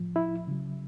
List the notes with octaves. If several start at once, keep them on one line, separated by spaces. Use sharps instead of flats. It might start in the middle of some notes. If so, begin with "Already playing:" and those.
Already playing: A2 F3
E4
C#3 F#3